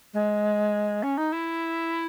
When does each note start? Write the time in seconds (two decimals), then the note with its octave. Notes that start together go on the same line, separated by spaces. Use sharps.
0.13 G#3
1.02 C#4
1.17 D#4
1.32 E4